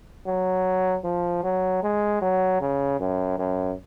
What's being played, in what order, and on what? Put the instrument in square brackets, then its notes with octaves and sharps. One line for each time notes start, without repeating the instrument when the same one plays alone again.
[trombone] F#3
F3
F#3
G#3
F#3
C#3
F#2
F#2